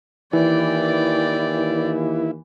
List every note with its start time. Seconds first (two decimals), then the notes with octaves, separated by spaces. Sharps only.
0.33 D#2 E3 E4 D5 G5